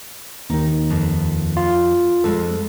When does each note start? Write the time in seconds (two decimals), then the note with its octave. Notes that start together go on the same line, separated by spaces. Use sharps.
0.50 D#2 D#3 D#4
0.90 F2
1.57 F4
2.24 F2 G#3 A4